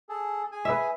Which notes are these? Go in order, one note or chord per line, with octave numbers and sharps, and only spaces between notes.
G#4 A4
G#4 G#5
B4 E5